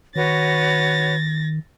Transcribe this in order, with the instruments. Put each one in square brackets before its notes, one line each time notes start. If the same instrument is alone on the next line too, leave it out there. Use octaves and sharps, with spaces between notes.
[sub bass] D#3 [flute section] F#4 B4 C#5 [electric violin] A6 A#6